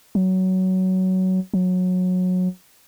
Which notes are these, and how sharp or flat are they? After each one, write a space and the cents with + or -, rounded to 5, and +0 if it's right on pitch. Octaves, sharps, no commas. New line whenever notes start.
F#3 +15
F#3 -20